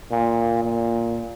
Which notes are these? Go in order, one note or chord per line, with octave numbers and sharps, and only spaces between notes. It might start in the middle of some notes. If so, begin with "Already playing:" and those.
A#2
A#2